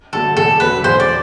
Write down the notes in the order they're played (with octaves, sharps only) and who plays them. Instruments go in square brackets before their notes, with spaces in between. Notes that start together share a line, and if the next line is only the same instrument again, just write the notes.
[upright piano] D3 F#3 A3 D4 [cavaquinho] A4
[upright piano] E2 [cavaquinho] A4
[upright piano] D3 F#3 A3 D4 [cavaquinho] B4
[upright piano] E2 [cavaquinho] C5
[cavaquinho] D5